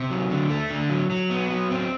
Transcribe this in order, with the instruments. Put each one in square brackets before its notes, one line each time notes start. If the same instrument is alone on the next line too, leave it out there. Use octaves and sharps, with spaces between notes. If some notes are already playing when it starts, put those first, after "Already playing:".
Already playing: [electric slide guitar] C3
F#3
D3
A3
D3
F#3
F#3
B3
F#3
C4